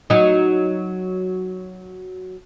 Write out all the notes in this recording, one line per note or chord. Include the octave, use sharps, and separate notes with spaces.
F#3 D#4